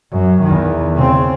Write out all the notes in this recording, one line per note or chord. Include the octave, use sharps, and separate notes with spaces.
F#2
E2 D#3
C#3 C4